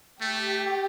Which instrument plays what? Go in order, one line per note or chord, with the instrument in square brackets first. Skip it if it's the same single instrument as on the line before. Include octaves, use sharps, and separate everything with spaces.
[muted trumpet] A3 [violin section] G4